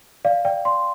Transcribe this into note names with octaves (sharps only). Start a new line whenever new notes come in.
D5 F5
D5 G5
D5 C6